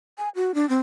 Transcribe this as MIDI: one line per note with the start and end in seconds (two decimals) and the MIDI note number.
0.18 0.29 80
0.35 0.54 66
0.54 0.68 62
0.69 0.80 60